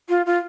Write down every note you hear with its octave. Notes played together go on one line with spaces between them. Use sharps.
F4
F4